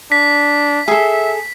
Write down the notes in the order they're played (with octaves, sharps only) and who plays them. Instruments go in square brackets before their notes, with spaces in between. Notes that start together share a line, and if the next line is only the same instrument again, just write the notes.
[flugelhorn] D4 [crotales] B6
[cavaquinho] G#4 A4 [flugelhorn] E5